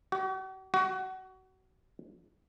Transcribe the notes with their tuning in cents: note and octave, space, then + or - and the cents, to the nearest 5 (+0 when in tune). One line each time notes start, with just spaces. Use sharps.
F#4 +45
F#4 +25